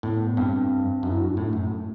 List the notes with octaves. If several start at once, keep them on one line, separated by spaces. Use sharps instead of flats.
A2 B3
G2 C4
F#2 D4
E4
F#4
D4
A2 A3
F#2
A3